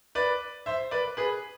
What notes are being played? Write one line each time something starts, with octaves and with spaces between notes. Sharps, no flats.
B4 D5
C5 E5
B4 D5
G#4 B4